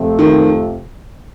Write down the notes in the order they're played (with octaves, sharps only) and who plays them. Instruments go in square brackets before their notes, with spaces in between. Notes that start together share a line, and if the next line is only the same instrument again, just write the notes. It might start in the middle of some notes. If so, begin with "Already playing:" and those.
Already playing: [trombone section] F2 C3 F3 A3 C4
[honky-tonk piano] D#3